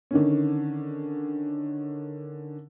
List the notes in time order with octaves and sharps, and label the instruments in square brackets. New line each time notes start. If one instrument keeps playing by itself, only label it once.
[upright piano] D3 D#3 C#4